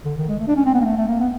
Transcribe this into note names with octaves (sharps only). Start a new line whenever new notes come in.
D3
D#3
G#3
A3
D4
C#4
C4
B3
A#3
A3
A3
A#3
B3